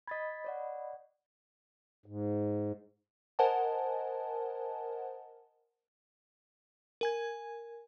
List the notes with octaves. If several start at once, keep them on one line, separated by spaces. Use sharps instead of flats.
D#5 B5 G#6 A6 B6
C#5 D5 F#5
G#2
A#4 C5 D#5 F#5 G#5 A5
A#4 G#5 G#6